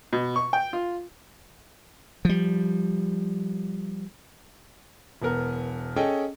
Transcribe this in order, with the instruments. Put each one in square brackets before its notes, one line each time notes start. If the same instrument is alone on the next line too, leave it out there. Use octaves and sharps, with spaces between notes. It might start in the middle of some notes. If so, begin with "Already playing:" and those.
[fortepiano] B2
C#6
G5
F4
[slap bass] F3 G3
[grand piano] E1 B3 A#4
C#4 G#4 A4 D#5 G5